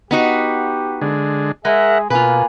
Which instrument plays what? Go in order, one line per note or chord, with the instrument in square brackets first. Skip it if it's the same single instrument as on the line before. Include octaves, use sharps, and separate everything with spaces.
[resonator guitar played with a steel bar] B3 D#4 F#4 [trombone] G4
[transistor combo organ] D3 G#3
[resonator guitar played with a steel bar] G#3 [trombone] G#4 [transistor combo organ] A#4 F#5 [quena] E5
[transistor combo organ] B2 [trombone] A#3 [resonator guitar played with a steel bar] F4 B4 [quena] G#5